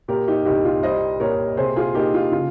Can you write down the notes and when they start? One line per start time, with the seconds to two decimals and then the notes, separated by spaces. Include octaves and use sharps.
0.08 A#2 G4 A#4
0.28 D#4 G4
0.45 C2 D#4 G4
0.65 F4
0.83 G3 C5 D#5
1.20 A#2 A#4 C#5
1.57 C3 G#4 C5
1.76 F4 G#4
1.95 A#3 D#4 G4
2.14 F4
2.32 C#3 F4